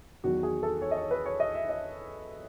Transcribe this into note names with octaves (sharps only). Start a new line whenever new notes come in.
E2 D#3 F#3 F#4
G#4
A4
C#5
D#5
C#5
B4
C#5
D#5
E5
D#5